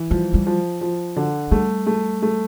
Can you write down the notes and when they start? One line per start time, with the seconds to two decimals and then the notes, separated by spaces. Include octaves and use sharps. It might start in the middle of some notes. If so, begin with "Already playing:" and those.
Already playing: E3
0.11 F3 G3
0.34 G3
0.46 F3
0.81 F3
1.16 D3
1.51 G3 A3
1.87 A3
2.22 A3